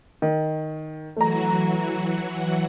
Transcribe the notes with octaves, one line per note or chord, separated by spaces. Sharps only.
D#3
E3 F#3 A3 F#4 A#5